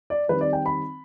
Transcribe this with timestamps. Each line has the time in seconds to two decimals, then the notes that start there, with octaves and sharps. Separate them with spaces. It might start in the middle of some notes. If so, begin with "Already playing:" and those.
0.10 D5
0.28 D#3 G3 C4 B4
0.41 D5
0.53 G5
0.66 B5